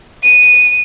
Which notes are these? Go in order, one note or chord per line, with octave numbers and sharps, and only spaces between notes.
D#7